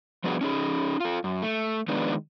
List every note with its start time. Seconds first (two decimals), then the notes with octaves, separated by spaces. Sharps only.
0.24 F3 G3 B3 D4 F#4 G#4
0.41 C#4 D#4 G#4
1.00 F4 A4
1.24 F#2
1.42 A3
1.88 D#3 F3 G#3 B3 D4